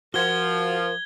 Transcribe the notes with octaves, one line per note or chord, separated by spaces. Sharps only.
F3 F#4 A#4 F#5 G#6 G7